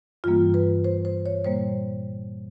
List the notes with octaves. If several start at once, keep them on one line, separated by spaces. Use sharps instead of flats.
G2 E3 G3 A#3 F4
B4
C5
C5
C#5
A#2 G3 A#3 C5